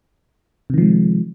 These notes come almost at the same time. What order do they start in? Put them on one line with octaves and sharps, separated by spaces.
C3 D#3 F3 G#3